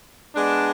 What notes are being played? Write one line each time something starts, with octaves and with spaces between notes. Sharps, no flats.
G#3 B3 D4